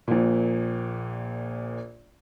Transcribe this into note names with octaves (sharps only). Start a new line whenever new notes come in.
A#1 A#2